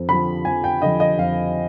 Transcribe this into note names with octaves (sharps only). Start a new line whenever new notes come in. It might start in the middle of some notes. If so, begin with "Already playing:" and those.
Already playing: F2
D3 F3 B5
F2 G#5
G5
D3 F3 D#5
D#5
F2 F5